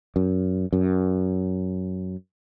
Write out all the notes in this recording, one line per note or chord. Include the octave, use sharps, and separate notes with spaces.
F#2
F#2